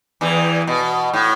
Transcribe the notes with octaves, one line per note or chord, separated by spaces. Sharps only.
E2 E3
B2
A2